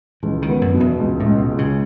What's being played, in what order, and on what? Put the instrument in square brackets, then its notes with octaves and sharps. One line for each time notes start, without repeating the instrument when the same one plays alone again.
[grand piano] C#2 [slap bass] E3
[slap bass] D#3
[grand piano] B3
[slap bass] F#2
[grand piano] B2
[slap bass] E2
[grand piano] C#2
[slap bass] A2
[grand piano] C#2
[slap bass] B2
[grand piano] C#2
[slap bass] C#3